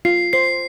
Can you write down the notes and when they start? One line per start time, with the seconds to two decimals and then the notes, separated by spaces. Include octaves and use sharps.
0.05 F4 C7
0.33 C5 C7